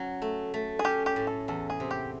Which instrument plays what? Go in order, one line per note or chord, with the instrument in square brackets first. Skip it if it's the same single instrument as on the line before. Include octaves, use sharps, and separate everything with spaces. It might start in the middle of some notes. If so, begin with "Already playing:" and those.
Already playing: [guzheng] F#3 C#4
A3
A3
[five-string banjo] G#4
[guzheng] C#4 [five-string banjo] G4
[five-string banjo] G4
[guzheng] A2
[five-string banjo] A4
[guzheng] E2 [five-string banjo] A4
[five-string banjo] G#4
[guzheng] C3
[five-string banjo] G4